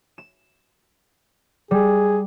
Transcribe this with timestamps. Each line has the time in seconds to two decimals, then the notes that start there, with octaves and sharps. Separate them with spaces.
0.18 E7
1.71 G3 G#4